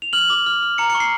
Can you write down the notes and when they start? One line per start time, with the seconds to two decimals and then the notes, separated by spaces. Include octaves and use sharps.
0.02 F7
0.13 F6 F#7
0.30 D6
0.46 F6
0.63 F6
0.78 A#5 C#7
0.90 C#7
0.95 C#6
1.00 C7